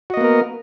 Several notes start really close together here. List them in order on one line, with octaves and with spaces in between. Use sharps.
F#4 D#5 A#3 B3 A#4